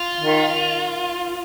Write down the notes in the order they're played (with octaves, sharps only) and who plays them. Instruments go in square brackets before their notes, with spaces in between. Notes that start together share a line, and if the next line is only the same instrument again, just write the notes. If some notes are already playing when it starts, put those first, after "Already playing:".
Already playing: [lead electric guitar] F4
[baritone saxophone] D#3